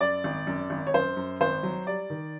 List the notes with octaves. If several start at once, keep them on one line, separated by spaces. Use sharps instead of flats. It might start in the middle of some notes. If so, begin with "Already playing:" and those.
F#2 D5
G#1
F#2
G#1
C#5
F#2 C5
F#2
G#1 C5
F#3
G3 D5
D#3